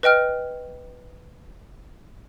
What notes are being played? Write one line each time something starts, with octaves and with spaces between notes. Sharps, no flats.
B4 D#5 G5 F6